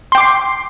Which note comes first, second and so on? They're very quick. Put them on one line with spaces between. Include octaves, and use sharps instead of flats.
C6 G5 D6 C7